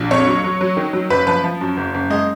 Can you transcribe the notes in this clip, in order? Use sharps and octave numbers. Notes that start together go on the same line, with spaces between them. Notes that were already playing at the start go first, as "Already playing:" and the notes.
Already playing: A#1
F2 C#5
F#3
F#3
F#3
D#3
F#3
F#1 B4
F3 B4
F3
F#2
F#1
F#1
G#3 D#5